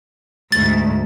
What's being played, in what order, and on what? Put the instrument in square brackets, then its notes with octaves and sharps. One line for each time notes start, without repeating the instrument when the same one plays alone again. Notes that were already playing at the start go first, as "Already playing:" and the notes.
[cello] D2 G#2 [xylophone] A6